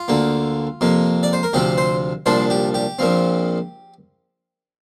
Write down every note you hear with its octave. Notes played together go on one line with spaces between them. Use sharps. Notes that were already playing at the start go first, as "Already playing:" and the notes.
Already playing: F4
D2 D3 A#3
F2 C3 A#3
D5
C5
A#4
D2 C3 F3 C4 G4
C5
C2 A#2 F3 D4 C5
G4
G4
A#1 A#2 F3 C4